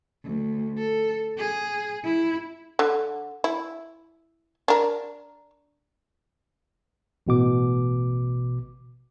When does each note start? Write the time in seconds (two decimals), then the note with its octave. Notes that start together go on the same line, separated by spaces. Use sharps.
0.24 D2
0.78 A4
1.37 G#4
2.04 E4
2.79 D3
3.44 E4
4.68 D4 A#4
7.27 A1 B2 D6